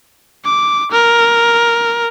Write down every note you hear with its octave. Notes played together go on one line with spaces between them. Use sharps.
D6
A#4